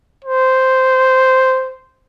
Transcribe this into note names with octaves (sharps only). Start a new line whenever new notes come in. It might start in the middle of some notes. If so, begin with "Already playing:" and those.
C5